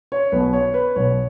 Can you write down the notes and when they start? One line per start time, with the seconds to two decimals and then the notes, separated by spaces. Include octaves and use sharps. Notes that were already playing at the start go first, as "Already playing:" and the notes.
0.12 C#5
0.32 B1 B2 B3 B4
0.53 C#5
0.74 B4
0.96 B1 B2 B3 C#5